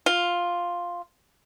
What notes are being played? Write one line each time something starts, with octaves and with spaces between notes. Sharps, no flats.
F4